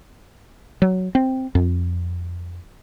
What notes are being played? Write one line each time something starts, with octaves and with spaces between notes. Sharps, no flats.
F#3
C4
F2